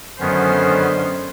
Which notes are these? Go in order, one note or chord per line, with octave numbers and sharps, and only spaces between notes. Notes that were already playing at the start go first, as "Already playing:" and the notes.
F#2 D3 D#3 B3 C#4 C5